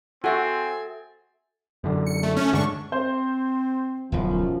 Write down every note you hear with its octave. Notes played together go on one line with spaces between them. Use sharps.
C4 F#4 A4 E5 G#5 A6
F#2 D3
C#7
A3
A3 C#4
G2 D3 G#3 D4 C#6
C4 C5
D1 B1 F#2 F3